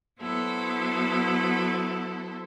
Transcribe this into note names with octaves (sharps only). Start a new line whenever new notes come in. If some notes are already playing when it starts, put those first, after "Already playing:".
F#3 B3 E4 A4 C5